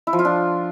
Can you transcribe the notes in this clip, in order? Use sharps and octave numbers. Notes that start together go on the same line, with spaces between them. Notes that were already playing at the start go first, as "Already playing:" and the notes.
E4
F3
F4
D4